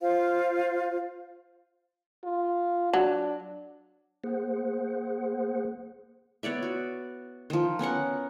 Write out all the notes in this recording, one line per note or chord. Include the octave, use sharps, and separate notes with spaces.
F4 C5 F5
F4
F#3 D4
A#3 G#4 C5 F#5
B3 C#5 D5 E5
F#4
D#3 F3
B3 C#4 A#4 F#5